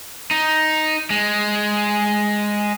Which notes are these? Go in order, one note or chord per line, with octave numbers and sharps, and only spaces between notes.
D#4
G#3